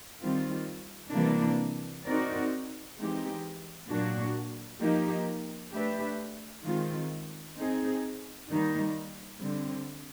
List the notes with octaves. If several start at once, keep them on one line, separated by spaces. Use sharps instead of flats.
D#3 G3 C4 F4
C3 E3 G3 A#3 D4
C4 D#4 F#4 A#4 D5
E3 G#3 C4 D#4 G4
A#2 F#3 A#3 D4 F#4
F3 A#3 D#4 G4
A3 D4 G4 B4 E5
D#3 G#3 C4 F4
C4 D#4 G#4
D#3 G3 A#3 D#4
D3 G3 C4